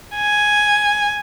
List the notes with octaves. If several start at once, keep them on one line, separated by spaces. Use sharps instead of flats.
G#5